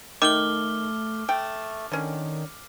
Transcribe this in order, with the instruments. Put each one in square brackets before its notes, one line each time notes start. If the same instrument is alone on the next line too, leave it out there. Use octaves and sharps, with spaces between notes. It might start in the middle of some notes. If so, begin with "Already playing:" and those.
[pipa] D#3 [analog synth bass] A3 [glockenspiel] D6 F6 G7
[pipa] A3 G5
[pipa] D3 C#4 [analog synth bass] D#3